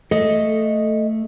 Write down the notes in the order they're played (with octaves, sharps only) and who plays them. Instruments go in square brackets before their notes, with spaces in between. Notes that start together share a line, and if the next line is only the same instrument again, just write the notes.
[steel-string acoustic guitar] A3 [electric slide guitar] A4 D#5